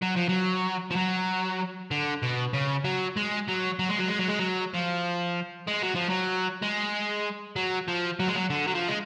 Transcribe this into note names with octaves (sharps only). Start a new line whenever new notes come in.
F#3
F3
F#3
F3
F#3
D3
B2
C#3
F#3
G#3
F#3
F#3
G#3
F#3
G#3
F#3
G#3
F#3
F3
G#3
F#3
F3
F#3
G#3
F#3
F3
F#3
G#3
F#3
D3
F#3
F3
G#3